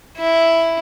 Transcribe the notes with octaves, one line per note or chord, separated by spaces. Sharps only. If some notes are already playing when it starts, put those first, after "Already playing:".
E4